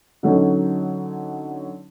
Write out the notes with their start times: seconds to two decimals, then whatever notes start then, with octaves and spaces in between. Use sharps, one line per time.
0.23 D3 F#3 C#4 D#4